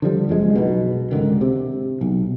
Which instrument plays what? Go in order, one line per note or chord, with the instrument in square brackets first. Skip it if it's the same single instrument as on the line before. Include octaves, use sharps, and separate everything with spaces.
[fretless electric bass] D3 F3 G3
F#1 F3 G#3
B1 B2
C#2 G#2 D3 D#3
C3
B1